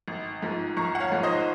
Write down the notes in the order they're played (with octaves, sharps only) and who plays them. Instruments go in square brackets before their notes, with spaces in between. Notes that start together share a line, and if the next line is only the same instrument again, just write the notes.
[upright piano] G#1
G#2 F3
G#1 A#5 C#6
F#5
C#5 F5
G#2 F3
C5 D#5